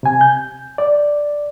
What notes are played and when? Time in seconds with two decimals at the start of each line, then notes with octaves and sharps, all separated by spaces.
0.03 C3 G#5
0.21 G6
0.78 D5